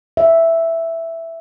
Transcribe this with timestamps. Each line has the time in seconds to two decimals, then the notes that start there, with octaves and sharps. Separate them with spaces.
0.17 E5